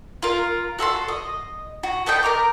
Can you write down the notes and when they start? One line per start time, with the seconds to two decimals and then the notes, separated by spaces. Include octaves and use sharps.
0.23 F4 A#4
0.79 F#4 A4 A5 C6
1.08 D#5
1.83 F#4
2.06 B3 A4 D#5 G5
2.23 A#4 A#5 D6